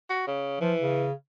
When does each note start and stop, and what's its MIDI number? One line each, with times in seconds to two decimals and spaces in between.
0.10 0.26 66
0.27 0.56 49
0.61 1.05 52
0.61 0.73 53
0.81 1.12 49